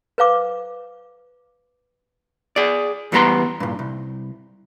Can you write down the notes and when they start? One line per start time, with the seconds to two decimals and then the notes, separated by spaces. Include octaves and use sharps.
0.18 B4 C5 F5 D6
2.56 G#4 D5
3.12 E2 G3 B3 A4 A#5 C6
3.60 G2 A#2
3.79 C2